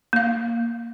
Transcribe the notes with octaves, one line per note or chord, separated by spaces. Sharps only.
A#3 F5